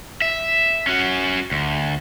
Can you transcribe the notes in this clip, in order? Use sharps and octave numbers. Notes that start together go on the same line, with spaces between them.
E5
C#4 F#4
D2